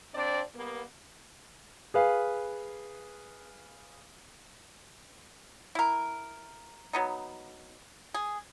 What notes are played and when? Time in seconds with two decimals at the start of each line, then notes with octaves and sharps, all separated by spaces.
0.14 F2 C4 D4 D5
0.54 G3 A#3 B3
1.94 G#4 B4 F5
5.75 E4 A#4
6.93 F#3 B3 D#4
8.14 G#4